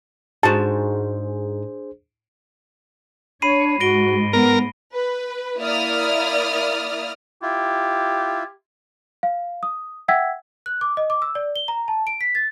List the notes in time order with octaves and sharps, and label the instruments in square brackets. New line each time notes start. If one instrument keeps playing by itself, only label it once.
[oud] G#2 F#4 [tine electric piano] D4 G#4 C5 [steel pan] A5
[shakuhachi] D4 [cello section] C#5 [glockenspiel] B5 C7 D#7
[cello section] G#2 [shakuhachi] F#4 [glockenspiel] A#6 D7 G7
[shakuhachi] B3 [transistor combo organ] A#4
[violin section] B4
A#3 E4 D5 D#6 F6
[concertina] E4 F4 [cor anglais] G4
[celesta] F5
D#6
E5 F#5 G5 E6 G#6 B6
F#6
D6
D#5
D6
E6
D5
G7
A#5
A5
D7
B6
A6